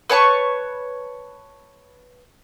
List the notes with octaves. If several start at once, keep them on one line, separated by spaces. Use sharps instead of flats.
B4 C#5 A5 C#6